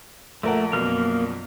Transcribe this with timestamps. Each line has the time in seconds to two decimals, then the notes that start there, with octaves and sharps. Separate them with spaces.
0.43 A#1 A3 A#4 F#5
0.73 A#1 F#2 B2 A#3 F6